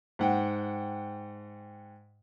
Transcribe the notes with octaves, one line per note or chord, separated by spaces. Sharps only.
G#2 F#5 G5